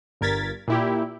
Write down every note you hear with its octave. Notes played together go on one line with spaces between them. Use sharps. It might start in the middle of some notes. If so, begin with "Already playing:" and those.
G1 G2 A#4 G#6 A6 B6
A#2 E4 G4